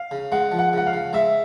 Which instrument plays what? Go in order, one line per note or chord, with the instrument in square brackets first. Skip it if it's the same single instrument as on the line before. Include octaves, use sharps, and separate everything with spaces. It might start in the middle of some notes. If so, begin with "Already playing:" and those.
Already playing: [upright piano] F5
[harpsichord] C#3
[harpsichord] G#3 [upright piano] F#5
[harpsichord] F3
[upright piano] F#5
[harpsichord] C#3 [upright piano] F#5
[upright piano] F5
[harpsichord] C#3
[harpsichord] G#3 [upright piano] E5